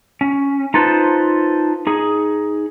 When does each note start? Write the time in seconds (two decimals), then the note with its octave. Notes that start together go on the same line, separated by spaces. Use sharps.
0.21 C#4
0.74 D#4 F4 A4 B4 C5
1.87 D#4 G#4